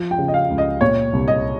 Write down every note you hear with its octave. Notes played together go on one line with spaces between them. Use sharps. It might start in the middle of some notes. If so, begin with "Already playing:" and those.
Already playing: F3
G5
C#3
D#5
F5
C#2
D#5
A#2 C#5
C2
D#5